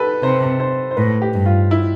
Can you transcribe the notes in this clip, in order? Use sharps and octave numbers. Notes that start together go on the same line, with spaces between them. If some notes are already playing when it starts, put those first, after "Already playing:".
Already playing: G4 A4 B4
C3 C5
C5
C5
A2 B4
G4
G2
F4
E4